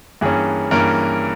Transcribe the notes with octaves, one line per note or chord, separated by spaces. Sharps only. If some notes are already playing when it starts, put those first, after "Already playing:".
G2 E3 A#3 C#4 G#4
G2 E3 A#3 C#4 A#4